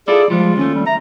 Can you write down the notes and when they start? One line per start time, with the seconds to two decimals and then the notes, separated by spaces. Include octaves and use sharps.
0.08 E4 F4 G#4 A4 D5
0.30 F3 G3 G#3 F4
0.57 D#2 A3 C#4
0.75 G3
0.86 E5 A#5